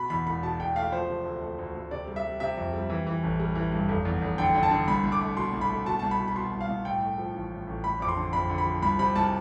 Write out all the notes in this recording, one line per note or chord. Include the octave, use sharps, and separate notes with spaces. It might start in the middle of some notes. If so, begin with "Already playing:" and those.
Already playing: B2 B5
E2 B5
E1 B5
B2 A5
E1 G5
A3 F5
F3 C5
C3
D2
A3
D2
D2
C3 D5
G3
E5
G3
C3 E5
F2
G3
E3
E3
A1
G3
E3
G2
F1
E2
F1
D3 G5
D3
A5
D3
C2 B5
C2
D6
A3
B2 C6
C2
B5
A3
B2 A5
C2 A5
B5
B2
B5
B2 C6
C2
F5
C2
A2 G5
A3
F3
A1
A2
A1
A3 B5
F2 D6
C6
D3
F2 B5
D3
B5
F3
C2 B5
C3 B5
C2 A5